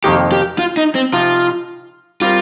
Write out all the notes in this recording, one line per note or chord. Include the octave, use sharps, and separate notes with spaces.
F2 C3 D#3 A#3 D#4 G4
G4
F4
D#4
C4
C3 F3 D#4 F4
G3 C4 F4 G4 A#4